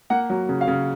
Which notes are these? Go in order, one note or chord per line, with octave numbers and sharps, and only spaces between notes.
A#3 F#5
F#3
C#3
F5
C#3